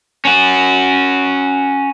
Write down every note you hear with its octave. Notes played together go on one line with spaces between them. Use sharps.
C#4 F#4